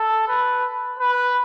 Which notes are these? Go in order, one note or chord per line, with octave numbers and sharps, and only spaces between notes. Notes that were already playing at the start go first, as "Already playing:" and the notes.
Already playing: A4
B4
B4